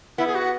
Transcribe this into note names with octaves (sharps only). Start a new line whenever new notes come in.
B3 E4
G#4
F#4